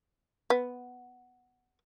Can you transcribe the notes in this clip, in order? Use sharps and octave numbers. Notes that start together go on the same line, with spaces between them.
B3